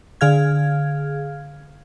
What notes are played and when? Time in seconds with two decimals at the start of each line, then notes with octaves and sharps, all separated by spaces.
0.21 D3 G#4 F5 F6 G#6